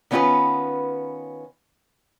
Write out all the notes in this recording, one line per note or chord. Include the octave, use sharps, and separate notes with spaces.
D#3 B3 C#4 D#4 F4 B4